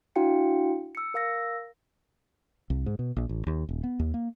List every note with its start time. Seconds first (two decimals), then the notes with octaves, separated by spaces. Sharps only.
0.16 D4 E4 F#4 F5 G5 C#7
0.95 E6 C#7
1.14 A#4 F5 E6 A#6
2.70 C2
2.86 G#2
2.99 B2
3.16 A#1
3.29 A1
3.47 D#2
3.69 D#1
3.83 B3
3.99 D#2
4.14 A#3